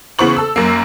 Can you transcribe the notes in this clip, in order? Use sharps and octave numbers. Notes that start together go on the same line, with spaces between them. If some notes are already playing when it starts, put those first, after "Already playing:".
C#3 E3 B3 C5 C#6 F#7
A4 E6
F#2 A#3